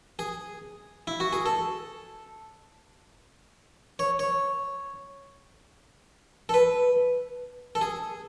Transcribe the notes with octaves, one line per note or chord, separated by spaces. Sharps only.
G#4
E4
F#4
G#4
A4
C#5
C#5
A4
B4
A4
G#4